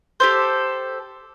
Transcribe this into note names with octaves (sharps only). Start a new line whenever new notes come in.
G4 A4 C5